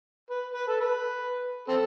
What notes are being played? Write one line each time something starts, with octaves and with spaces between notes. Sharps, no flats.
B4
B4
A4
B4
C4 A4